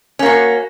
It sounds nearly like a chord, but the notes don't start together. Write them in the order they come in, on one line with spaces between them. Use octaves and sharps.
C#4 A#3 F#4